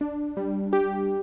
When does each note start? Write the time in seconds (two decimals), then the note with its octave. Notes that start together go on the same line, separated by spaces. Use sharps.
0.01 D4
0.37 G3
0.73 G4